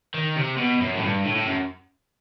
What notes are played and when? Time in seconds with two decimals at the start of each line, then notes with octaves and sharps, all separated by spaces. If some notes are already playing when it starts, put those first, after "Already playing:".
0.14 D#3
0.36 C3
0.57 B2
0.80 F#2
0.96 A2
1.03 G2
1.25 A2
1.36 A2
1.46 F#2